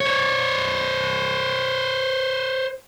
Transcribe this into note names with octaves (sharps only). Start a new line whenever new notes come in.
C5 C#5